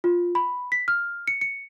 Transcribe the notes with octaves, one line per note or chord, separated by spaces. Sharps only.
F4
B5
B6
F6
C#7
C#7